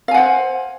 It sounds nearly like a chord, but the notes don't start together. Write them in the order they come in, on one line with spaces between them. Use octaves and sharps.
F5 G#5 F#5 C5